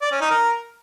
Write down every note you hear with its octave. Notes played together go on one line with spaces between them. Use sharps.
D5
C#4
D#4
A#4